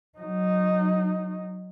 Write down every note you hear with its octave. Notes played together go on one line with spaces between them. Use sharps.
F#3 D#4